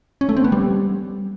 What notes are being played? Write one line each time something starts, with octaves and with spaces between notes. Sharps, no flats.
C#4
A3
C4
B3
G3